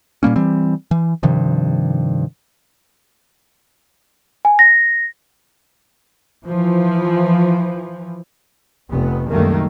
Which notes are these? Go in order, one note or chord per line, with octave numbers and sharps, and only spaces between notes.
A#2 G3 A#3 C#4
E3 G3 C4
E3
G2 C3 D#3 F3
G#5
A#6
E3 F3
F1 B3
C2 F#2 D#3 A3 A#3